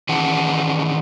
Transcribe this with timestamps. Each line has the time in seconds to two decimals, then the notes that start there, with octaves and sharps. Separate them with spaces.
0.09 D#3 E3 C#4 G#4 F#5 A5